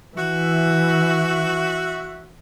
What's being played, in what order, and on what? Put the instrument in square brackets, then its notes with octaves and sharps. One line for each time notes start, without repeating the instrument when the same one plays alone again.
[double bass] E3 [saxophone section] F#4 E5